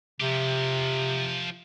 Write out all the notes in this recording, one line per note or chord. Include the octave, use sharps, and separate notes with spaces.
C3 F3 G4